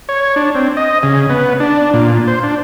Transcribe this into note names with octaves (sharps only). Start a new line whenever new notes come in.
C#5
D4
C4
D#5
C#3
B3
D4
A#2
C5
D4